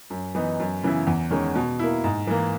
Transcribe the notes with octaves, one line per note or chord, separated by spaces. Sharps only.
F#2
E3 B3 D#4
F#2
C#3 E3 B3 E4
E2
D#3 G#3 C#4
B2
A#3 E4
G#2
E3 A#3